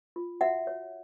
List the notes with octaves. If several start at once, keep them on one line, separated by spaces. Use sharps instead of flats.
F4
F#4 E5 F#5
C#5